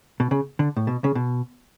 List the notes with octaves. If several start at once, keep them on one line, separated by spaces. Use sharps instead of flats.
B2
C#3
D3
A2
B2
C#3
B2